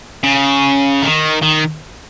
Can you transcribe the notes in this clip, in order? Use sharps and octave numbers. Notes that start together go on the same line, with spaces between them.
C#3
D#3
D#3